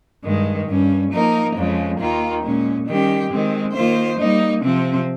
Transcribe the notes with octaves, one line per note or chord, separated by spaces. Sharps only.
G2 D#3 G#3
G2 G3 C#4
F3 A#3 D#4 A#4
F2 C#3 F3 G#3
D#2 D#3 A#3 F4
A#2 G#3 C#4
D#3 G3 C#4 G4
D#3 G#3 C4
D#3 A#3 F4 C5
G3 A#3 D#4
C3 F3 C4